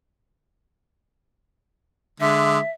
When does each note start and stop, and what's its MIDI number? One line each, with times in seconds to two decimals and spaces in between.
2.20 2.59 50
2.20 2.59 56
2.20 2.71 76